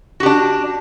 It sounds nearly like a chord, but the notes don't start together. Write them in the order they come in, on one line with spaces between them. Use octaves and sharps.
F#4 G4 D4